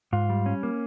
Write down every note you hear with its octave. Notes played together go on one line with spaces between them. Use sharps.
G#2 F4
G3
C#4
A#3